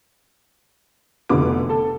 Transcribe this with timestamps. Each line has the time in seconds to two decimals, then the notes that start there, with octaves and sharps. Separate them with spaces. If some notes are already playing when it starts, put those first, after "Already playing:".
1.29 F1 D3 B3 F4 B4 D6
1.69 A4